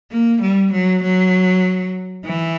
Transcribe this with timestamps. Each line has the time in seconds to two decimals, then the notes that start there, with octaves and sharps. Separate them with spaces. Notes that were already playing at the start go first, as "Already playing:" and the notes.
0.11 A#3
0.42 G3
0.73 F#3
1.03 F#3
2.26 E3